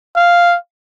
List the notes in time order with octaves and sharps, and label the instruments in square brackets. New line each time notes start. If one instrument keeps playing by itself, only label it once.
[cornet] F5